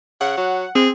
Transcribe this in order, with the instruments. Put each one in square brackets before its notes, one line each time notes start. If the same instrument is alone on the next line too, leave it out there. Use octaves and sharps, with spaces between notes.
[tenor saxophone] C#3 [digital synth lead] F#5
[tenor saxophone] F#3
[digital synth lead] C4 [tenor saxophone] G#4